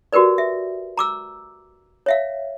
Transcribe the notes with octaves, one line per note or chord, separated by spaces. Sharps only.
F#4 G4 A#4 B4 D5
E5
A#5 D6 E6
C#5 E5 F5